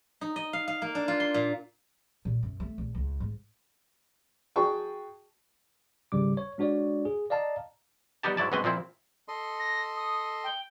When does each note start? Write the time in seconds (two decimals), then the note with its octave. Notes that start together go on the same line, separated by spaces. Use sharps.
0.21 D#4
0.36 D#5
0.53 F5
0.68 F5
0.82 A#3
0.95 D4
1.08 F4
1.20 C6
1.34 A#2
2.25 A#2
2.43 F#2
2.60 A3
2.78 A#1
2.95 C#2
3.20 G#2
4.56 F#4 G#4 G5 A5 C#6
6.12 G#1 C#3 G3 D6
6.37 C#5
6.58 G#3 D4 F#4 C#5 D5
7.05 G#4
7.30 D5 D#5 F5 A5 A#5
8.23 G3 B3 D#4 G4 A5
8.37 G#2 F#3 E4 D5 A5
8.52 F#2 B2 G#3 C4 B4 D#5
8.64 A#2 F3 C4 E4
9.28 A4 D#5 C6
9.59 A#6
9.97 D#6
10.44 G5